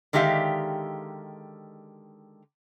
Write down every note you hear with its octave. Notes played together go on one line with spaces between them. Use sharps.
D3 D#3 G#3 G4 E5 F5